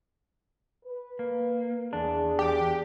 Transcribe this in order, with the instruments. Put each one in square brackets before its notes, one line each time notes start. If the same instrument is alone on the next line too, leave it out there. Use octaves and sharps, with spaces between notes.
[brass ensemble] B4
[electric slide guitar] A#3
[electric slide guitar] E2 D4 [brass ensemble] G#4
[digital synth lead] G4